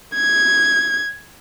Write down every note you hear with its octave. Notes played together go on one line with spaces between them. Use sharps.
G#6